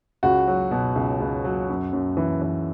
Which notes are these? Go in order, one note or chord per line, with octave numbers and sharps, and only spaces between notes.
C#2 F#4
F#3
B2
C#2
C#2
F#3
F#2
F#2
E3
E3